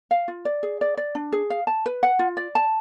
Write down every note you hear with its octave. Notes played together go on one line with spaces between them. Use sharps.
F5
F4
D5
G#4
D5
D5
D4
G#4
F5
A5
B4
F#5
F4
D5
A5